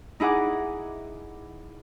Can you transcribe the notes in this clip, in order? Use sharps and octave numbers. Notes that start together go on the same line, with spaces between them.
D#4 E4 G#4 F#5 D6